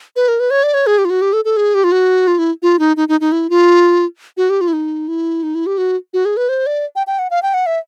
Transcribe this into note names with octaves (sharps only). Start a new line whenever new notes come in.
B4
A#4
B4
C#5
D5
C#5
G#4
G4
F4
F#4
G4
A4
A4
G#4
G4
F4
F#4
F4
E4
F4
D#4
D#4
D#4
D#4
E4
F4
F#4
G4
F4
E4
D#4
E4
D#4
E4
G4
F#4
F#4
G#4
B4
C5
D5
G5
G5
F#5
F5
G5
F#5
E5